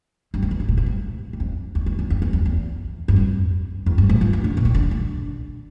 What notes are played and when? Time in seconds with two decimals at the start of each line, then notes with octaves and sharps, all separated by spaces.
0.34 G2
0.42 F2
0.51 E2
0.60 G2
0.69 A#2
0.77 A2
0.86 F2
1.33 G2
1.40 F2
1.75 E2
1.86 E2
1.99 E2
2.10 F2
2.22 E2
2.33 F2
2.46 E2
3.08 G2
3.16 F2
3.86 F2
3.98 G2
4.09 A2
4.21 F3
4.33 E3
4.44 D3
4.57 A#2
4.65 C3
4.75 D3
4.91 D3